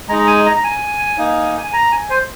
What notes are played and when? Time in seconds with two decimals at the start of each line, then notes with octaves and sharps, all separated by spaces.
0.09 G#3 A#5
0.12 D#4
0.19 A#5
0.27 G#5
0.46 A#5
0.57 A#5
0.64 G#5
1.18 A#3 D#4
1.63 G#5
1.73 A#5
1.92 G#5
2.10 C5